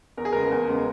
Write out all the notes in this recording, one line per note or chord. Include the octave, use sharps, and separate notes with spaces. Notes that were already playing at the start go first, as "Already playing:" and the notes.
E2 A#4
G#4
C#3 G#3 B3 A#4
E2
C#3 G#3 B3